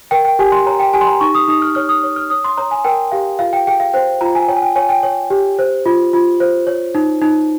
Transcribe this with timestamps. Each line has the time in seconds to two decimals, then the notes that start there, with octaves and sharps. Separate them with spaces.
0.11 A#4 G5
0.25 G5
0.39 G4 G#5
0.52 C6
0.66 C#5 A#5
0.80 G5
0.93 G4 G#5
1.01 C6
1.07 A#5
1.20 D#4 C#6
1.35 D#6
1.48 D#4 D#6
1.62 F6
1.75 C#5 F6
1.89 D#6
2.03 C#5
2.16 F6
2.30 C#5 D#6
2.44 C6
2.57 C#5 A#5
2.71 G#5
2.84 A#4 G5
3.12 G4 F5
3.39 F4 F5
3.53 G5
3.67 G#4 G5
3.80 F5
3.94 C5 G5
4.21 F4 A#5
4.35 G#5
4.48 C#5 G5
4.56 G#5
4.62 G5
4.75 C#5 G#5
4.89 G5
5.03 C#5
5.30 G4
5.59 C5
5.86 F4
6.13 F4
6.40 C5
6.67 C#5
6.95 D#4
7.22 D#4